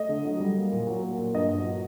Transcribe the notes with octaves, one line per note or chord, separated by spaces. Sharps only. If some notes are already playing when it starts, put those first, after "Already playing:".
Already playing: A3 D#5
D3
F#3
G3
A#3
A#2
F#3
A#2
A#2
G2 D#5
F#3
F#3